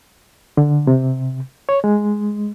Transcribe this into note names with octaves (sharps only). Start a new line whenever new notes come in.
D3
C3
C#5
G#3